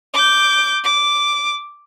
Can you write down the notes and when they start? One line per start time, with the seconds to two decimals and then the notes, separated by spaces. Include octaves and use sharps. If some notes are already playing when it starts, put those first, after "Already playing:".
0.14 D6 G6
0.84 D6